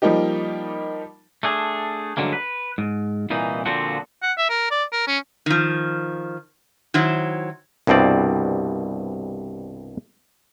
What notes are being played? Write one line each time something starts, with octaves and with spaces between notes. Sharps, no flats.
F3 G3 A#3 D#4 G4
A3 D4 G#4
G2 D3 F#3 G#3 A#3
B4
G#2
C2 A#2 E3 D#4
A#2 D3 F3 C4 F#4
F#5
E5
A#4
D5
A#4
C#4
D#3 F3
D#3 F#3 E4 C5
C2 G2 B2 C4 D5